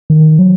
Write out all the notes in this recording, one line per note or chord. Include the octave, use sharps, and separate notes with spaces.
D#3
F#3